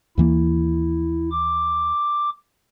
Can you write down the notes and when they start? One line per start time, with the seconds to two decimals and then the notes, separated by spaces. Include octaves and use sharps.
0.18 D#2 E3 A#3 E4
1.31 D6